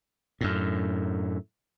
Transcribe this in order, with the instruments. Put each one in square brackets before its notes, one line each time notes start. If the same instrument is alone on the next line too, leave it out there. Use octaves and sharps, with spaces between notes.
[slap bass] F#2 A2